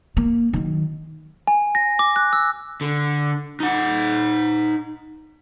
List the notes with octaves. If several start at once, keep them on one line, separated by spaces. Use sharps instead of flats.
A#3
D#3 F#3
G#5
A#6
D6
F#6
E6
D3
D#4 F#5